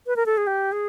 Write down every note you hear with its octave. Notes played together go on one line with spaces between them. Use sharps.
B4
A#4
A4
G#4
G4
G#4